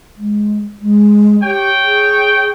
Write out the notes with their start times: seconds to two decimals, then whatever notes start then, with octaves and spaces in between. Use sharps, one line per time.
0.16 G#3
0.81 G#3
1.43 G4 C#5 G5
1.83 G#4